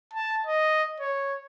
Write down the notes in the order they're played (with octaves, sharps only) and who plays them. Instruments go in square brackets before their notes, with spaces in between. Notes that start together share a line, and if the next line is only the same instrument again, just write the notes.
[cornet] A5
D#5
C#5